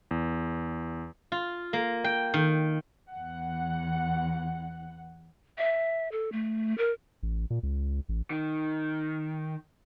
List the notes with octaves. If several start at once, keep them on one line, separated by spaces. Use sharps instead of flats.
E2
F4
A#3
G5
D#3
E2 F#5
E5
A4
A3
A#4
A1
A#2
C#2
A1
D#3